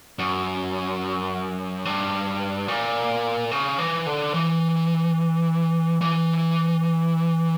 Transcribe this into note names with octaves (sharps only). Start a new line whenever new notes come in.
F#2
G2
A#2
C#3
E3
D3
E3
E3